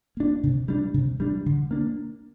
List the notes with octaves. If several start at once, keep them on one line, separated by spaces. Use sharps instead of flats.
A#3 D4
C3
G3 D4
C3
G3 D4
D3
A#3 D4